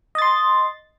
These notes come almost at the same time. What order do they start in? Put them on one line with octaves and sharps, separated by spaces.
D#5 A6 C6